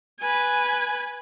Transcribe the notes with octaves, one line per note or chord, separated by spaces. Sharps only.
B4 G#5